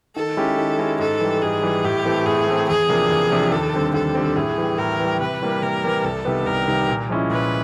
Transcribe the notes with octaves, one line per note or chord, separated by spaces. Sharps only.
D#3 A4
G#3 C#4 E4 G4
D#3
G#3 C#4 E4 G4
G#2 A4
E3 G3
G#2 G#4
E3 G3
A2 G4
E3 A3 C4
A2 G#4
E3 A3 C4
E2 G#4
C3 F3 A#3 D4
E2
C3 F3 A#3 D4
D#2 A4
D3 G3 C4
D#2 A4
D3 G3 C4
A2 G#4
E3 G3
A2 A#4
E3 G3
C3 B4
E3 G3 A#3
C3 A#4
E3 G3 A#3
C2 A4
C3 D#3 G3 B3
C2 A#4
C3 D#3 G3 B3
A#2
F3 G#3 C#4 E4
A#2 B4